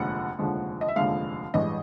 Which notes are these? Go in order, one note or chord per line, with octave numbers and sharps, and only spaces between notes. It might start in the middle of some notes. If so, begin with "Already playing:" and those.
Already playing: F1 D#2 D3 F3 G#3 F#5
F1 D#2 D3 F3 G#3
D#5
E5
F1 D#2 D3 F3 G#3 F5
A1 G2 E3 G#3 D#5